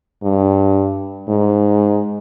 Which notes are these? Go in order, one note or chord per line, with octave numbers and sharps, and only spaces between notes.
G2
G#2